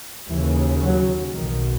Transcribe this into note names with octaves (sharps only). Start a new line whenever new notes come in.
D#2 C#3 E3
F#3
B1 B2 D#3